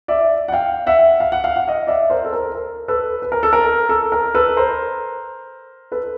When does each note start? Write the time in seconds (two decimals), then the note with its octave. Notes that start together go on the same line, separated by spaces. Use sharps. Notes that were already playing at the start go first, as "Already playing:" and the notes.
0.08 D5 E5
0.48 F#5
0.52 F5 G5
0.87 E5 F#5
1.20 F5
1.32 F#5
1.44 F5
1.56 F#5
1.68 D#5 F5
1.87 D5 E5
2.10 A#4 C5
2.25 A4
2.33 A#4
2.55 A#4
2.88 A4 B4
3.22 B4
3.32 A#4
3.43 A4
3.53 A#4
3.89 A4
4.12 A#4
4.34 A4 B4
4.57 A#4 C5
5.92 A4 B4